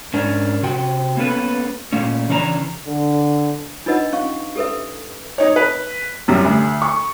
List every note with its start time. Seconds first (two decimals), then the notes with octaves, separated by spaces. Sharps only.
0.14 G#2 C#4 D4 A#4
0.63 C3 F#4 G5
1.17 A#3 B3 C#4 A4 B4
1.93 A#2 C#3 A3 A#3 C#4
2.29 C#3 E3 C#4 D4 B4 A#5
2.88 D3
3.86 D4 D#4 F4 B4 D#5 F#5
4.13 C#4 F5 C#6
4.56 G4 A4 B4 E5
5.38 D#4 C#5
5.56 B4
6.28 F#2 G3
6.44 D2
6.82 C#6